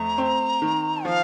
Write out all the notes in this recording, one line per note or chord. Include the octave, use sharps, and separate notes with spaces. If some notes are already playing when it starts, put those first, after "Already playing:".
Already playing: F2 A3 A#5
C4
D#3
F3 F5